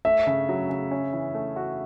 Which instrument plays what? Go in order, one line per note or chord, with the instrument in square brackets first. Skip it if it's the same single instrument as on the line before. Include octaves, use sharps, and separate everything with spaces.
[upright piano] A3 [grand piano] E5
[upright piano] C#3
F#3
C#3
C#4
E3
A3
F#4